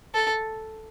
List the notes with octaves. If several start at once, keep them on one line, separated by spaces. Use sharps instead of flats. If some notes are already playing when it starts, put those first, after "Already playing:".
A4